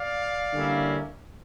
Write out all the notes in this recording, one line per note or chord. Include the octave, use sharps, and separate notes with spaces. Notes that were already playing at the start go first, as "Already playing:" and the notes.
Already playing: D5 F5
D3 G3 A#3 C#4 E4